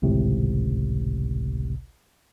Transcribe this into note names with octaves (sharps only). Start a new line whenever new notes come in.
G#1 C#2 A2 C3